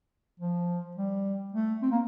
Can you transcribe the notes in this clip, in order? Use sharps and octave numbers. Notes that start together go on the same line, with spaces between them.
F3
G3
A3
C4
A#3